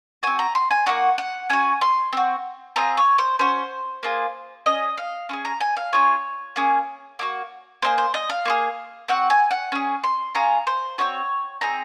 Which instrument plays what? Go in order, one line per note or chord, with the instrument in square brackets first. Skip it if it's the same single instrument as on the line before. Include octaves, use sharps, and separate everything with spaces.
[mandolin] C4 F#4 G#5
A#5
C6
G#5
A#3 D#4 F#4 F#5
F#5
C#4 F#4 G#5
C6
C4 F#4
C4 F4 G#4 A#5
C#5
C5
C#4 F#4 C5
A#3 F4 G#4
C#4 G#4 D#5
F5
C#4 F4 G#4
A#5
G#5
F5
C#4 F4 G#4 C#5
A#3 C#4 G#4
A#3 D#4 F#4
A#3 D#4 G#4 C5
C5
D#5
F5
A#3 F4 G#4
C4 F#4 F#5
G#5
F#5
C#4 G#4
C6
C#4 F4 G#4 A#5
C5
C4 D#4 F#4 C#5
C4 D#4 G#4 A#5